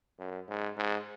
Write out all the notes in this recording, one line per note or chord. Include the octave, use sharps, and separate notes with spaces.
F#2
G#2
G#2